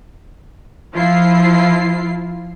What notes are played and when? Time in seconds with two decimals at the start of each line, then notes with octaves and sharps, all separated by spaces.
0.93 F3 E4 F4 C7